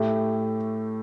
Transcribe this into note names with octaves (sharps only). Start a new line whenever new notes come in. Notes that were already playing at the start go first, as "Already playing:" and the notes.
Already playing: A2 A3 G4